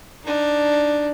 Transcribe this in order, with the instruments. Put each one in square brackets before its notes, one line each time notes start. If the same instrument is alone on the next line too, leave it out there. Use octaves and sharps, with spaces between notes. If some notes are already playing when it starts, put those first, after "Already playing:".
[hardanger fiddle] D4 D#4